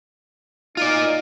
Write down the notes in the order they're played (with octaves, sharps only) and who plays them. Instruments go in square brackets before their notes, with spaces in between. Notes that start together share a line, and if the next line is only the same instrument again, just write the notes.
[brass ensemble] D#4 [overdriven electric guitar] F4 D5